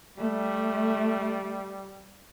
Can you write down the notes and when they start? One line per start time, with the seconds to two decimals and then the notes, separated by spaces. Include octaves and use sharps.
0.18 G3 A3